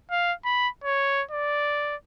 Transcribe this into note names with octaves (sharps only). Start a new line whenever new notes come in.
F5
B5
C#5
D5